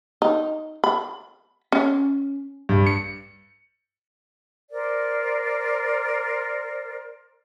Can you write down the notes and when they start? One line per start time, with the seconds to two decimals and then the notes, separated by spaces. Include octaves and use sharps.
0.22 D#4
0.84 B5
1.72 C#4
2.69 G2
2.87 C#7
4.71 A#4 C5 D5